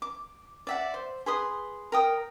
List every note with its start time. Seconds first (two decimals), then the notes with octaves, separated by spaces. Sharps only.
0.02 D6
0.67 D5 E5 F#5
0.94 C5
1.26 G#4 B4 C6 D#6
1.92 A#4 G5 D#6